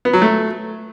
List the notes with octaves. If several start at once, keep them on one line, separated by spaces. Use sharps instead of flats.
B3
F#3
A3